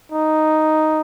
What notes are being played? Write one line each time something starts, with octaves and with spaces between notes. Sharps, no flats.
D#4